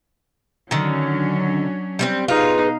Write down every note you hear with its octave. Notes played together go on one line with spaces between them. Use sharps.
D3 D#3 F#3 C#4 D4
G3 B3 C4
B2 D#4 F4 G#4 B4 F5